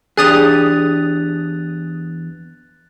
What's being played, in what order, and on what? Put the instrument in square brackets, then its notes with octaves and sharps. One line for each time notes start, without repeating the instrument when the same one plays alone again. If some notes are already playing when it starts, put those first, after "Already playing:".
[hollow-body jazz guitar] E2 D4 G4 [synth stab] G#4 D#6 [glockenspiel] F#6 A6 F7